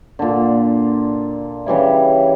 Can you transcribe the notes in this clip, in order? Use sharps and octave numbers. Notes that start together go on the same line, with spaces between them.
A#2 D3
C#3 E3 G3 E4